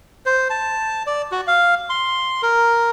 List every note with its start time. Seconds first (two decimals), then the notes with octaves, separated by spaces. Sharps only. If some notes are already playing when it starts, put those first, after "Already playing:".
0.26 C5
0.50 A5
1.07 D5
1.32 F#4
1.47 F5
1.90 C6
2.43 A#4